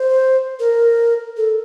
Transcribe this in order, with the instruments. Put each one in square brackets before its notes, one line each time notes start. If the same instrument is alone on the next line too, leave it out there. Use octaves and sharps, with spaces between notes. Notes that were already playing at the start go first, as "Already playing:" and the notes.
Already playing: [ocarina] C5
A#4
A4